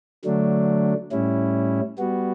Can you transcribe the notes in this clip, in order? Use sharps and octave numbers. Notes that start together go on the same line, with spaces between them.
D3 F#3 A3 D4
A2 G3 C#4 E4
G3 B3 F#4